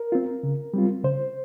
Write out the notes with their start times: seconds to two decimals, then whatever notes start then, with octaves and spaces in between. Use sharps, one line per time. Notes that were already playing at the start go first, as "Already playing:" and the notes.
Already playing: A#4
0.12 C4 F4
0.43 C#3
0.74 G3 C4 F4
1.04 C#3 C5